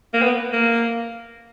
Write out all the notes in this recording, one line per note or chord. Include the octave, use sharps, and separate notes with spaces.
A#3
B3
A#3